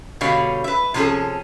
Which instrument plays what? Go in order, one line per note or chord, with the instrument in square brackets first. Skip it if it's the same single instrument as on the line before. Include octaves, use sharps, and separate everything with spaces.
[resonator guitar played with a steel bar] B2 D3 G3 C#5 F5
B4 E5
C3 F3 C#4 F4 G#4 A4